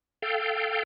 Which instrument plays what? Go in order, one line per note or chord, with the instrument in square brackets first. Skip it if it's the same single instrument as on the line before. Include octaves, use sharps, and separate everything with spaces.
[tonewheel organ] A4 F5 G5